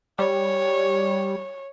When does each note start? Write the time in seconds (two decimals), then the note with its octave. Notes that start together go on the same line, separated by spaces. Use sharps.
0.19 G3 C#5